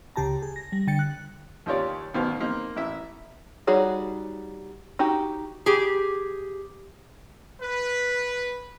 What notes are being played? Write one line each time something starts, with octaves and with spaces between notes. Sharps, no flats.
C#2 C#3 G4 A5 A#5
G#4
A#6
G3 A#6
D3 G5 A6 C#7
F#6
D#2 D#3 F4 G4 C#5 D5
A1 B2 D#3 C5 F5 F6
A#3 C4 D#4
A1 E4 E5
G3 D#4 F#4 G#4 C#5
D#4 F#4 G4
G4 G#4
B4